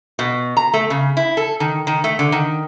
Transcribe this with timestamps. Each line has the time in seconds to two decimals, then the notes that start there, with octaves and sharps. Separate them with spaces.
0.19 B2
0.57 A#5
0.74 A3
0.90 C#3
1.17 E4
1.37 A4
1.60 D#3
1.87 D#3
2.04 A3
2.19 D3
2.32 D#3